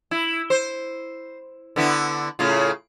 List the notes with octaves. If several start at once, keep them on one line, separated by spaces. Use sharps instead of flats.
E4
C5
D3 B3 E4
A2 C#3 F4